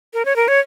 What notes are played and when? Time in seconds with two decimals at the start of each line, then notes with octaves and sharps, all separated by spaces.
0.14 A#4
0.25 C#5
0.36 A#4
0.48 C#5